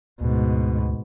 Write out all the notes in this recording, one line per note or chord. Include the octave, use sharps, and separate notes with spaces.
D2 G#2 B2